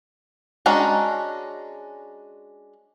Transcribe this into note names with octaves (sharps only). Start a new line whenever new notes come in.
G#3 C#4 D4 F#4 A#5